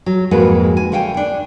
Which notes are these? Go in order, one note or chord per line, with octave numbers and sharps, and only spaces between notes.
F#3
F2 G#2 G#3 A#3 F#4 B4
G#5
D3 A3 F5 G5 G#5
D4